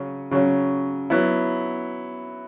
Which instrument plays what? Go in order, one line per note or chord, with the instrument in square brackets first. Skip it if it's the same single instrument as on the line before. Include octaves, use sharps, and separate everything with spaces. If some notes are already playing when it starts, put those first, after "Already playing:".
Already playing: [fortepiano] C#3 F#3 C#4
C#3 F#3 C#4
F#3 B3 E4